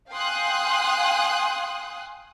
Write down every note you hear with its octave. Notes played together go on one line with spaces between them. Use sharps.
F5 G5 G#5 C6 D#6 F#6